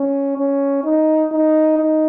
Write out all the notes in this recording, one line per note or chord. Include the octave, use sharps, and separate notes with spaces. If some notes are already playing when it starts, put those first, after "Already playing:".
Already playing: C#4
C#4
D#4
D#4
D#4